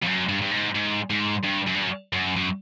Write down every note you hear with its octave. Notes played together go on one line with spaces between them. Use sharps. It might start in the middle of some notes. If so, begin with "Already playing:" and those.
F2
F#2
G2
G2
G#2
G#2
G#2
G2
F#2
G2
F#2
F#2
F#2